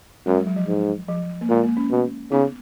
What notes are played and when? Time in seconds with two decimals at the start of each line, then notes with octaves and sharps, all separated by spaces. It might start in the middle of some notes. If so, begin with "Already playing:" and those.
0.26 F#2 G#3
0.36 F#3
0.47 F#3
0.56 F3
0.68 G#2
1.08 F3
1.41 A#3
1.49 A#2 G#3
1.64 A#3
1.77 C#4
1.91 B2
2.32 C#3 B3 D#4